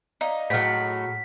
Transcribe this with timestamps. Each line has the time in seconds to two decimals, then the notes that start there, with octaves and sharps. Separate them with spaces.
0.21 D#4 D5 F5
0.50 A2 F#3 G#4 F#5 F6 B6